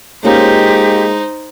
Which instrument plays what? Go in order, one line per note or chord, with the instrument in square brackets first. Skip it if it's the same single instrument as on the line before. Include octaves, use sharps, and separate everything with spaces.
[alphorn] G#3 [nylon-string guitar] A#3 C#4 F4 [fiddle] D#4 C5 [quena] G4